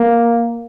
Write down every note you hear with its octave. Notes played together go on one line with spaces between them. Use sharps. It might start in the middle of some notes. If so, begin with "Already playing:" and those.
Already playing: A#3